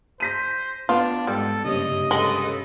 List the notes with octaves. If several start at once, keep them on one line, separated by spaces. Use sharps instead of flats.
C5 A#6 B6 D#7
B3 D4 F4
G#2 G3 A4
F#1 G2 C3 C#4 D#5
C#3 G#3 A4 B4 A#6 F#7 G7